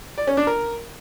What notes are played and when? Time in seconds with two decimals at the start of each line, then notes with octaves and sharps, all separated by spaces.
0.18 D5
0.27 C#4
0.37 D4
0.47 A#4